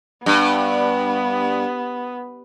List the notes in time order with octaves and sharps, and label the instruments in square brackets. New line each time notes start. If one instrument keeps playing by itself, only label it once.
[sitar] G2 [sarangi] B3